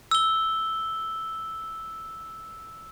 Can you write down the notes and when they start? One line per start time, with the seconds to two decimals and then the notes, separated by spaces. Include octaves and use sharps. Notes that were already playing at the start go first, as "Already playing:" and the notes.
0.11 E6 G7